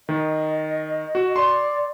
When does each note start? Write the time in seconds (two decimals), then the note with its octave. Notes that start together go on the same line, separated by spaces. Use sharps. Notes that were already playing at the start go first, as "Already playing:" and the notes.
0.09 D#3 D#5
1.15 F#4
1.36 D5 C6